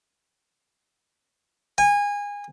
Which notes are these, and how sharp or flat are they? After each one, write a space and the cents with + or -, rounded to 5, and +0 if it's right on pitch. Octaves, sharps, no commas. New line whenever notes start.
G#5 -25